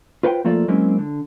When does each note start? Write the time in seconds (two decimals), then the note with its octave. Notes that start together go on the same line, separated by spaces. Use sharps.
0.23 F4 B4 C5 F#5 G5
0.44 F3 A3 A#3 F4 A4 D5
0.68 F#3 G#3 A#3 C4 C#4 E4
0.99 D3